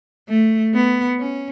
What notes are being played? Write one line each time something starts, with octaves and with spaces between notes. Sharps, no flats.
A3
B3
C#4